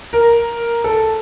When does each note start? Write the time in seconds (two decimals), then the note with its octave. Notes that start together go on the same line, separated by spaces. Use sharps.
0.13 A#4
0.84 A4